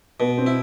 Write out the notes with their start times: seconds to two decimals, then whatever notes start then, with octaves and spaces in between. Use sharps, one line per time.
0.20 B2 B3
0.38 C4
0.46 E4